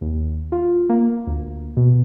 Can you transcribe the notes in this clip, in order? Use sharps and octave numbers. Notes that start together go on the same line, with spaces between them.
D#2
F4
A#3
D2
B2